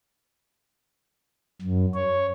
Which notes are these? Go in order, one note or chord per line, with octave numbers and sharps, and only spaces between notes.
F#2
C#5